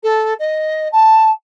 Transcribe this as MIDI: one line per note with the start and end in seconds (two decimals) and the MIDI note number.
0.03 0.34 69
0.39 0.88 75
0.92 1.31 81